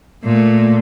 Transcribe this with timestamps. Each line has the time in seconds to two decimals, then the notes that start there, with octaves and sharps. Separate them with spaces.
0.24 A#2 A3